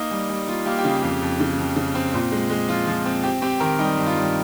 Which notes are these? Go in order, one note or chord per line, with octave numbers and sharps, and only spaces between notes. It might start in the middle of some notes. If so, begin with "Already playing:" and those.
Already playing: A#3 D#4
G3
G3
A#3 F4
A#3 G4
G4
C#3 G#4
F2 G4
F2
C#3
F2
C#3
C4
A#2
G#3
G#3
F3 F4
F3
C4
C4 G4
C4 G4
D#3 A#4
G3 D#4
G2
F4
G3